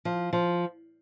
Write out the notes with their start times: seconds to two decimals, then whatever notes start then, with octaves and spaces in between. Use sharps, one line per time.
0.05 F3
0.33 F3